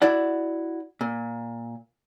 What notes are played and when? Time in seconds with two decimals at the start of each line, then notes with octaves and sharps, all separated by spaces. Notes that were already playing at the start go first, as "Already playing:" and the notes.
0.02 E4 F#4 D5 F#5
1.01 A#2